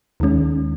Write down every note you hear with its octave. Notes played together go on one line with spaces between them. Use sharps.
D#2 D#3 G#3 C#4